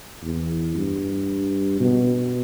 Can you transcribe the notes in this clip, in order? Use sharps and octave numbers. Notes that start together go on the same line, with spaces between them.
E2
G2
B2